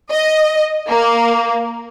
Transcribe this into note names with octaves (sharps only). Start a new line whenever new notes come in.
D#5
A#3